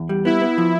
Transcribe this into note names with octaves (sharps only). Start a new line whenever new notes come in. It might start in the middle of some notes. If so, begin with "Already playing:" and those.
Already playing: E2
G3
B3 E4
B3
F3